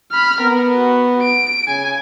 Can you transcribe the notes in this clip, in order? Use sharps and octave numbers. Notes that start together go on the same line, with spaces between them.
B5 F6
B3 A#4
F#4
D7
C#3 G#5